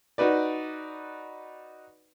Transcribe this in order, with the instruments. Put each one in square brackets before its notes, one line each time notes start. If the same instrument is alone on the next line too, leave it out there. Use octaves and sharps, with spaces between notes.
[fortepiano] D#4 F#4 B4 D5